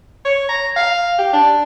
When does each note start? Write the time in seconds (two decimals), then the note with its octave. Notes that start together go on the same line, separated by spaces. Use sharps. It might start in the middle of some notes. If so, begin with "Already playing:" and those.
0.25 C#5
0.49 A#5
0.76 F5
1.18 G4
1.33 D4